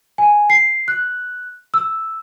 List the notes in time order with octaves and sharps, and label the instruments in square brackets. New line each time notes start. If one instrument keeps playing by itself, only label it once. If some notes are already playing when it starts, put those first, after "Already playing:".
[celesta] G#5
C7
F#6
E6